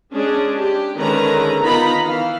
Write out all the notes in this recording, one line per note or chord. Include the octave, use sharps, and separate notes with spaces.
G#3 C#4 D4 G#4
G4
D3 D#3 G#3 C#4 B4 A#5
D#3 B3 D#4 F4 A#5 B5
E3 F5